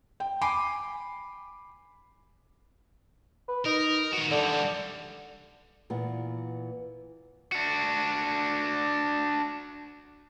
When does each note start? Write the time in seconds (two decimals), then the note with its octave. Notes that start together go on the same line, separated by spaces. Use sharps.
0.20 G5
0.41 G5 G#5 B5 D6 C7
3.48 B4
3.65 D#4 A#4
4.13 D#3 F#4
4.31 D3 E3 G3
5.90 A#2 E3 B3
7.52 D4 F#4